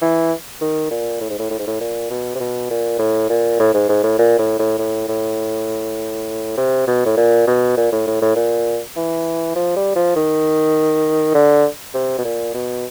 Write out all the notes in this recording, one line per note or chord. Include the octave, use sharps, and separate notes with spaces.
E3
D#3
A#2
A2
G#2
A2
A2
G#2
A2
A#2
B2
C3
B2
A#2
A2
A#2
A2
G#2
G#2
A2
A#2
A2
A2
A2
A2
C3
B2
A2
A#2
B2
A#2
A2
A2
A2
A#2
E3
F3
G3
F3
D#3
D3
C3
B2
A#2
B2